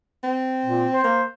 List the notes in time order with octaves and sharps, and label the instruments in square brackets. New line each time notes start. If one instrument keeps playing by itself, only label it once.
[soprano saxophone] C4
[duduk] A#2
C5
[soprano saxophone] A#3